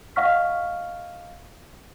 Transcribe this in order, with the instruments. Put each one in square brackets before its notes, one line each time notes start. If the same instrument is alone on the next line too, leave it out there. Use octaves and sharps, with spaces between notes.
[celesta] D#5 F5 F#5 C#6 F6 B6